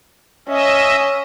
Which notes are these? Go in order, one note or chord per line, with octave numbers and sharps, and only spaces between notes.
C#4 D#5 E5